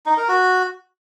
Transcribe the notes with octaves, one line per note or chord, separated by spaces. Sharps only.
D#4
A#4
F#4